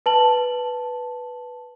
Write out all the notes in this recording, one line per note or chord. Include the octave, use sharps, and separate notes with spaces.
B4 A5 F#7